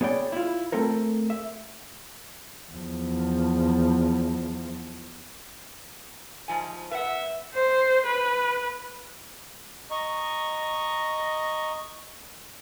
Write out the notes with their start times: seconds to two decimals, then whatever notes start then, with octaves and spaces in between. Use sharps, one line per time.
0.01 B3 G#4 C#5 D5 G5
0.32 E4 F4
0.72 A3 C4 A4 A#4
1.30 E5
2.72 E2 F3
6.48 G#2 F3 G#5
6.91 B4 E5 F#5
7.54 C5
8.06 B4
9.91 D#5 A#5 C#6